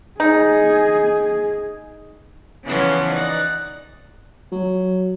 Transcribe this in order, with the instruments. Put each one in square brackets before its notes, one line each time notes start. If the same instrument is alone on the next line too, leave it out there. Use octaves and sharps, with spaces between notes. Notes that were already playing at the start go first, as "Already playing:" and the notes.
[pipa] D#4 [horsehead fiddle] G#4
[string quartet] C#3 E3 F3 B3 C#4
D#4 D5 F#5
[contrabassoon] F#3